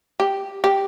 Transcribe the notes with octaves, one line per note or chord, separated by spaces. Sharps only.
G4
G4